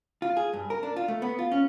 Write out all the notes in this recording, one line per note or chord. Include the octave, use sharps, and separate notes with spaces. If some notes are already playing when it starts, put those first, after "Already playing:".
F4
G#4
G2
A#4
D4
F4
A3
B3
F4
C#4